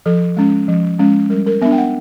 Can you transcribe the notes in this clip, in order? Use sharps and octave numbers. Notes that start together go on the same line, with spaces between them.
F3 A4
G#3 C#4
F3
G#3 C#4
G3 A#4
A#4
B3 D4 E5
G5
F#5